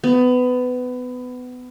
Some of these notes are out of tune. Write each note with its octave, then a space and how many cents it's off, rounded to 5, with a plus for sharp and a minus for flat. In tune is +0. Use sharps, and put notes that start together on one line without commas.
B3 +20